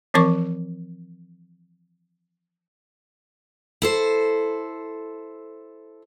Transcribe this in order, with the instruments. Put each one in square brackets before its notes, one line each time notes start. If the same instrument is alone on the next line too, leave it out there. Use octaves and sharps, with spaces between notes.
[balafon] E3 F3 C4 A#4 C#6 D6
[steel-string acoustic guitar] E4 A4 C5